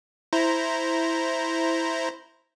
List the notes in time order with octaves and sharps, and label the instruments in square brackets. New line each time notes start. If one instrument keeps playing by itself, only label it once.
[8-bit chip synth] E4 C5 A#5